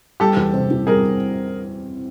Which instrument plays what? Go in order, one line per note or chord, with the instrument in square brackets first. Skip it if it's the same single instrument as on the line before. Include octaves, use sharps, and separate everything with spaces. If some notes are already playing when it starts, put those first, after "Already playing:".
[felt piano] G3 [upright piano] G4 A4
[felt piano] E2
C3
E3
[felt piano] G3 [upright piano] G#4 A#4